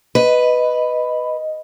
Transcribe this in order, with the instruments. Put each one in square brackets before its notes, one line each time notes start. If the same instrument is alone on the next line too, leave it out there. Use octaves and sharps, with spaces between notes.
[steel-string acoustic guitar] B4 [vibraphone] D#5